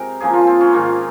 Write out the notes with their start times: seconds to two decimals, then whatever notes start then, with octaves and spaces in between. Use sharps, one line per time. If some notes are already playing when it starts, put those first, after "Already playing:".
Already playing: C3 G#3 A#4
0.21 C#3 F3 A#3 G#4
0.34 F4
0.47 C4
0.61 C#4
0.73 G#2 D#3 A#3 F4